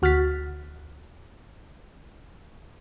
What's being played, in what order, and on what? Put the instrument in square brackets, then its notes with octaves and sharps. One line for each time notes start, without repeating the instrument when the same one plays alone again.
[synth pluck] D2 F#4 F6 F#6 A6 B6